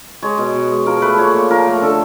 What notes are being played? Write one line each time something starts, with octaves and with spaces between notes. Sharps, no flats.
G#3 C#5
B2
B2
G#3
F3 A#4
A3 B4
A#2 C#5
A#2
F3 A#4
A3
D3 A4